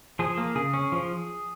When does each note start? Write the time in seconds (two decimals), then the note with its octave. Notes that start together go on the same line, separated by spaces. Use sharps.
0.19 F3 G#4
0.37 A#3
0.55 C#3 G#4
0.73 C#4
0.92 F3